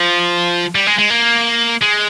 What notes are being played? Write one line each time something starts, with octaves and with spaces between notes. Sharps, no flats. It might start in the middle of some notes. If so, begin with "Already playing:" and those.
Already playing: F3
G3
G#3
G#3
A#3
G#3